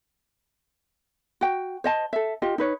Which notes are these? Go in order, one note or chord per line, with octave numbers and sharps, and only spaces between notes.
F#4 G5
C5 D#5 A5
A4 E5
F4 G4 D#5
D#4 B4 C#5